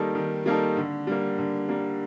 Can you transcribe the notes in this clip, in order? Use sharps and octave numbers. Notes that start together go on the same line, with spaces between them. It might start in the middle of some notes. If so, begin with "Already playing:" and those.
Already playing: D#3 G3 A#3 D#4 A4
D#3
G3 A#3 D#4 A4
D3
G3 A#3
D3
G3 A#3